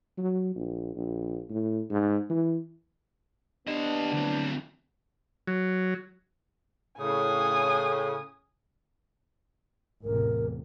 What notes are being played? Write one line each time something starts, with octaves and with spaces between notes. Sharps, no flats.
F#3
A#1
A#1
A2
G#2
E3
B3 D4 G4 D#5
D2 C4
F#3
A2 C#3 G#5 D#6
A1 E2 C3 A#4